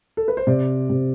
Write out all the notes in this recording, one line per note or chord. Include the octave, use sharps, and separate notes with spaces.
A4
B4
C5
C3 D5
C3